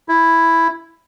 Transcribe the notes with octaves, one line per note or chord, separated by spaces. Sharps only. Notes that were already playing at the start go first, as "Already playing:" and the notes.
E4